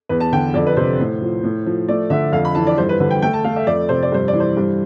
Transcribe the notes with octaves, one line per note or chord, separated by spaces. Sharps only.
E2 B4
A5
D3 G5
F2 D5
B4
C3 C5
A2
F3
A2
F3
A3 D5
D3 E5
F2 F5
B5
E3 A5
D5
G2 C5
B4
D3 B4
G5
A3 G5
A5
A3 F5
E5
F2 D5
C3 C5
D5
G2 C5
D5
E3
C5
G2